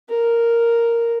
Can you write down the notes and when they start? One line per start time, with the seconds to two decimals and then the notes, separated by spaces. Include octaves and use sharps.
0.09 A#4